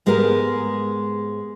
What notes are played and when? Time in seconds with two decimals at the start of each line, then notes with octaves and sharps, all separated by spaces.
0.06 G#2 G#3 B3 G4 A#4